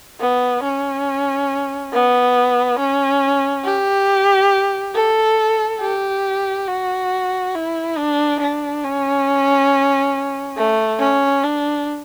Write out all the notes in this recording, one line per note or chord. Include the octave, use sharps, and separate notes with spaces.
B3
C#4
B3
C#4
G4
A4
G4
F#4
E4
D4
D4
C#4
A3
C#4
D4